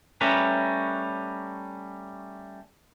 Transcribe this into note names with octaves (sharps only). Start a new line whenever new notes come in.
G3 A3 C#4 A#4 B4